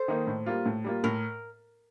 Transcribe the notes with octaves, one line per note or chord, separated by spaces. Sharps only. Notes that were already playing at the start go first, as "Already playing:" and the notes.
Already playing: A4 C5
D#3 A#3 D#4
A2
G3 A#3 F4
A2
G3 A#3 F4
A2 A#4